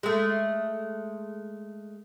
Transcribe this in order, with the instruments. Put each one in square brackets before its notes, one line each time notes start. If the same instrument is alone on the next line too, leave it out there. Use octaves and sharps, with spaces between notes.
[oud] G#3 A3